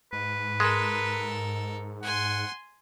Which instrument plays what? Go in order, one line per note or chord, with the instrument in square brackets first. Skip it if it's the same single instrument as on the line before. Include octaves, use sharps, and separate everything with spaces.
[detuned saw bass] G#2 [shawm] B4
[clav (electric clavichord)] G#3 [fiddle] A4 A#4
[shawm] F#5 [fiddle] G#5 C6